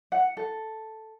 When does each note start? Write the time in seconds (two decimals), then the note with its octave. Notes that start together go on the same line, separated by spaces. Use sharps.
0.12 F#5
0.37 A4